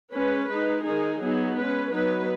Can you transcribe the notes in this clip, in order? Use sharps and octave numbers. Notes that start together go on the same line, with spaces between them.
G#3 C#4 B4
G#3 D#4 B4
D#3 G#3 D#4 G#4
F#3 B3 D#4 G#4
G#3 C#4 B4
F#3 B3 D#4 B4